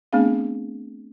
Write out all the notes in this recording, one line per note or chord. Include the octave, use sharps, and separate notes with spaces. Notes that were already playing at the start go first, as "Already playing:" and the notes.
A3 B3 C4 D4 G#4 F5